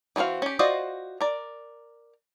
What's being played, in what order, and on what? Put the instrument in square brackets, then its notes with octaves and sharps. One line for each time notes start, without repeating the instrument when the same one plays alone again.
[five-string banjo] E3 A3 C4 F#4 F5
C#4 G4
F4 F#4 C5 D5 D#5
A#4 D5